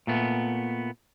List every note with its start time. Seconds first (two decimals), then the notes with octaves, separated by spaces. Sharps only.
0.07 A#2 A3 B3